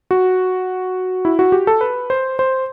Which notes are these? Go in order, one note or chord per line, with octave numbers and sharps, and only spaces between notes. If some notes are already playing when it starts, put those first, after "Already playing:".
F#4
E4
F#4
G4
A4
B4
C5
C5